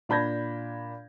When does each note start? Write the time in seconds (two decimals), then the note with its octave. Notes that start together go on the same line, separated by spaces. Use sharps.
0.09 A#2 D4 B5 G6 G#6 A#6